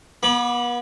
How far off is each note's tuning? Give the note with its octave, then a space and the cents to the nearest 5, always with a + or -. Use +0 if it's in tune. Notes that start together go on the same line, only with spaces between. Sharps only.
B3 -40 B5 -5 D6 +0